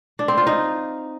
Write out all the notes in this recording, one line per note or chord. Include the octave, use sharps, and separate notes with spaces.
D4
C4
F4
D#4